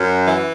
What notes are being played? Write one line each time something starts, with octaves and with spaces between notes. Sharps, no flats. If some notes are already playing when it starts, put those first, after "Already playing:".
Already playing: F#2
E3